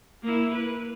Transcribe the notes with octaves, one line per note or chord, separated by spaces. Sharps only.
A#3 E4
B4